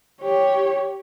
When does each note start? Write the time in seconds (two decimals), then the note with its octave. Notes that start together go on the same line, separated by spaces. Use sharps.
0.22 G4 C#5